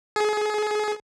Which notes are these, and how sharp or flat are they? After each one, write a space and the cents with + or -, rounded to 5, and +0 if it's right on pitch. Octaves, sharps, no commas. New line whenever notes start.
G#4 +30